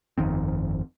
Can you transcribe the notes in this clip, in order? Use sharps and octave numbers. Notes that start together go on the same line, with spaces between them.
G1 F2 D#3 C4